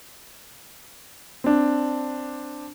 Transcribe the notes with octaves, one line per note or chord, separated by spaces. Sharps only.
C4 D4